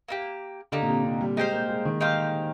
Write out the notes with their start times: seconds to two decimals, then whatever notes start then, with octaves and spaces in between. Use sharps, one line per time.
0.08 A#3 D#4 G4
0.72 D3 A#3 D#4 G4
0.82 A#2
0.89 C3
1.05 C3
1.21 G3
1.37 G#3 D#4 G4 C5 F5
1.53 A#3
1.69 G#3
1.85 D#3
2.01 D#4 G4 C5 F5